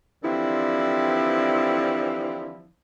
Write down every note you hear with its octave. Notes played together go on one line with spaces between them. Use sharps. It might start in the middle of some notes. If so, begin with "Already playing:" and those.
D3 E3 F3 G3 C4 E4